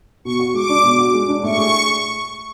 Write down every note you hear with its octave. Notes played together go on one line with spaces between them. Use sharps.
B2 C#6
F#4
G#3 D6
D4
B2
F#4
G#3
D4
A2 C#6
G#4